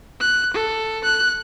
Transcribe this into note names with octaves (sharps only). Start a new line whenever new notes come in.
F#6
A4
F#6